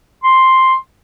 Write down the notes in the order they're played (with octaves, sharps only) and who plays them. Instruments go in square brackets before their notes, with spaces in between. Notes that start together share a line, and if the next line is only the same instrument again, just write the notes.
[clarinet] C6